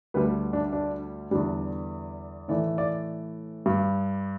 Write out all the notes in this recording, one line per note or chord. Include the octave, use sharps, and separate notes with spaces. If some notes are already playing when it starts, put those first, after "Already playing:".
D2 D3 G3 B4
D4
D4
E2 D3 G3 D4
A2 E3 A3 D5
D5
G2 G3